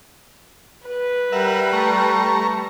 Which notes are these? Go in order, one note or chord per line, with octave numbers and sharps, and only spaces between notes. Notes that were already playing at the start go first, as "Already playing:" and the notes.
B4
G3 A#4 E5 F#5
A3 A#5 C#6